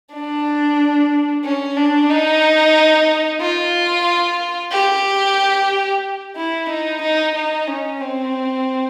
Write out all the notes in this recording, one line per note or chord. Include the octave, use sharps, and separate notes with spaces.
D4
C#4
D4
D#4
F4
G4
E4
D#4
D#4
D#4
C#4
C4